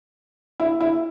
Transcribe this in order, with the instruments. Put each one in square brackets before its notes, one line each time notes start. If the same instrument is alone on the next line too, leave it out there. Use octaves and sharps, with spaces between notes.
[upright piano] E4
E4